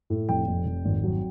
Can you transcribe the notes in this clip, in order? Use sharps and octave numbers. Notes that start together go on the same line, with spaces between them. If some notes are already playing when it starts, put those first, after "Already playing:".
A2
F1 G5
F2
F1
G#1
F#3